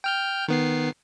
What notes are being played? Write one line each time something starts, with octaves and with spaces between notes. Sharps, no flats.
G5 F6 G6
D#3 B3 C7